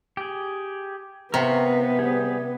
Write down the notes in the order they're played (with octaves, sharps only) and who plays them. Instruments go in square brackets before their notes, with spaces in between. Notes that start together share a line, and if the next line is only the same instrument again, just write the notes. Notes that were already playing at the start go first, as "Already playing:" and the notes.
[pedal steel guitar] G4 G#4
[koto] C3 [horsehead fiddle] B3 [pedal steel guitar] A#4 F5 C#6
[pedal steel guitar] G3 G4 G#4